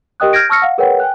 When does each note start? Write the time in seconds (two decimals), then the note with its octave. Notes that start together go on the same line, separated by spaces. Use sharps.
0.20 G4 A#4 D#5 G5 D#6 F#6
0.33 F6 G6 G#6 A#6 D7
0.49 A5 C#6 E6 F6 A#6 C#7
0.62 F5 F#5
0.78 G#4 A#4 B4 C#5 F#5 G5
1.00 G5 G#5 F#6